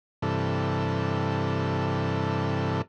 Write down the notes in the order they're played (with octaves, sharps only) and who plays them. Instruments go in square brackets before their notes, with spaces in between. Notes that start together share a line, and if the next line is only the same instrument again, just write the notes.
[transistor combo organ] G2 C3 E3 A4